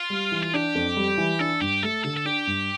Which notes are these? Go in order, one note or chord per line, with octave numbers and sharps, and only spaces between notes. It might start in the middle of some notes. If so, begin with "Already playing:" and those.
Already playing: F4
G3
E3
F4
D4 G4
F2
G3
E3
D4 A4
G2 G4
A3 A4
D3 A4
A4
D4 G4
G2